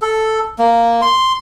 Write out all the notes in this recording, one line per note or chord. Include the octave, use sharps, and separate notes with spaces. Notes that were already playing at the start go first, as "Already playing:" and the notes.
A4
A#3
C6